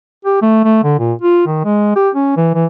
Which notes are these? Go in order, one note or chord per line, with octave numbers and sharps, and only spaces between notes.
G4
A3
A3
D3
A#2
F4
D#3
G#3
G4
C#4
E3
E3